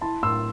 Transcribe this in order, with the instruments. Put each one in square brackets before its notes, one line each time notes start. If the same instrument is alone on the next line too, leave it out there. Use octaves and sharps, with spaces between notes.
[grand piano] E4 [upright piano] A5 C6
[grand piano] A2 [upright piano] C6 E6